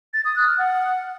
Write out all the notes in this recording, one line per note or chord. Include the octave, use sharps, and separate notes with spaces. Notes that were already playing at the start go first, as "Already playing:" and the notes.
A6
D#6
F#6
F6
F#5